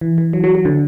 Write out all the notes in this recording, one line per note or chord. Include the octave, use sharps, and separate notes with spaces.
E3
E3
F#3
F#3
F#3
D3